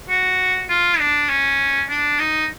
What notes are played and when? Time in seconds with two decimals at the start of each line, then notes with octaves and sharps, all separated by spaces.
0.09 F#4
0.69 F4
0.99 D4
1.29 C#4
1.89 D4
2.19 D#4